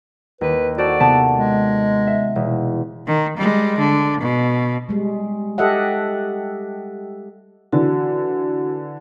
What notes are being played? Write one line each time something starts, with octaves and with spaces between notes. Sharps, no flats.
D#2 B4
F#4 A4 C5 D5
C3 B3 A5
G#3
E5
E1
D#3
G3 G#3
D3
B2
G3 G#3
G4 A4 D#5 E5 F#5
D3 E3 F#4